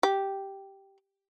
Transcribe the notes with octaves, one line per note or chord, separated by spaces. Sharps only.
G4